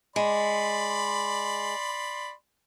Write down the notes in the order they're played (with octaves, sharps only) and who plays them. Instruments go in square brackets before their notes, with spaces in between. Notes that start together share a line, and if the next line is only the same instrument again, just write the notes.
[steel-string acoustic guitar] G#3 [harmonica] D5 B5 C6